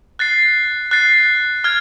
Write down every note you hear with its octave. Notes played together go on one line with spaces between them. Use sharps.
F#6 A6 C7
F#6 A6 C7
F6 G#6